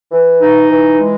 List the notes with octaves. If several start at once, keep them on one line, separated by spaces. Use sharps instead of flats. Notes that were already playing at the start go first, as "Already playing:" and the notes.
E3
D#4
E3
G#3